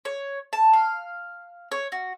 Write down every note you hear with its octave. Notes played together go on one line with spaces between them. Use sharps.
C#5
A5
F5
C#5
F#4